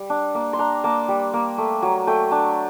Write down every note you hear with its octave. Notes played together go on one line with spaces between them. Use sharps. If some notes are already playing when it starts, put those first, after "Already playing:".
Already playing: G3
D4
A#3
C6
D4 A#5
A#3 A5
G3
A#3
A3
F#3
A3 G5
D4 A5